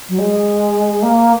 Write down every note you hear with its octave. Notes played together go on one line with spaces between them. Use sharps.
F#3
G#3
A#3